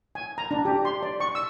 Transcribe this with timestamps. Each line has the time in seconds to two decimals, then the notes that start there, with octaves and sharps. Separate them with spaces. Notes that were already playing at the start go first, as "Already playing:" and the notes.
0.15 G#5
0.38 A#5
0.51 D4
0.65 G4
0.85 C6
1.03 D5
1.20 C#6
1.35 E6